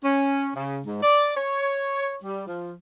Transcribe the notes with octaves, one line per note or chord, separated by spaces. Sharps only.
C#4
C#3
G#2
D5
C#5
G3
F3